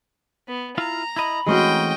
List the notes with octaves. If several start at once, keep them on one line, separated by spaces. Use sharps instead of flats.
B3
E4 F4 F5 A#5
E4 D#5 B5
E3 G#3 A3 C4 C#4 F#4 D#5 G5